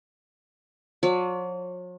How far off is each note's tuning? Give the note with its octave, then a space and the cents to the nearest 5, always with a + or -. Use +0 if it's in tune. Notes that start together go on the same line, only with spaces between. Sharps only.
F#3 -45 D5 -45